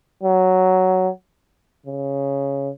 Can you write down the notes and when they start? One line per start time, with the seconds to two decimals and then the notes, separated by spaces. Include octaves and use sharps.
0.23 F#3
1.86 C#3